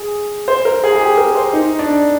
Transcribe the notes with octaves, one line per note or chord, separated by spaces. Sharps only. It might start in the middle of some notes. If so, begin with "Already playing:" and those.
Already playing: G#4
C5
A#4
G#4
G#4
G4
A#4
C5
D#4
D4